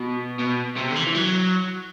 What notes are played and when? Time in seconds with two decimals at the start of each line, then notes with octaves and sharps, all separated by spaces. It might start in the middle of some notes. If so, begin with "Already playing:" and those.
Already playing: B2
0.39 B2
0.76 C3
0.90 D3
0.96 E3
1.06 E3
1.15 F#3